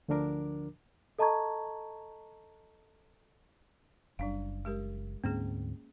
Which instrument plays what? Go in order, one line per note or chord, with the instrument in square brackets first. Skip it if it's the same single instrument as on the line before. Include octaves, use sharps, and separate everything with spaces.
[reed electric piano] D2 D3 F3 D4 A#4 D6
[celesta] A4 D#5 A5 A#5 C#6 G#6
[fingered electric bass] F#1 [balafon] G3 D4 F5
[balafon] G#3 G4 A#4
[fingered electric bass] D2 G#2 C4 [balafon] A#3 C#4 G#4